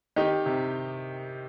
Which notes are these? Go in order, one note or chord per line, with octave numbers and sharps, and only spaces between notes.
D#3 D#4 G4
C3